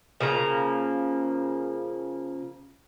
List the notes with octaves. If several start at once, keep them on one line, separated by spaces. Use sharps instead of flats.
C#3 F3 A#3 A#5